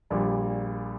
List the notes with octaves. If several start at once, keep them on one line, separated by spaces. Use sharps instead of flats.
A#1 A#2 G3